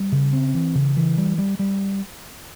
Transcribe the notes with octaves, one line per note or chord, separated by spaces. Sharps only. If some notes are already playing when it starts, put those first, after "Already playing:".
Already playing: G3
C#3
C4
E3
C#3
E3
G3
G3
G3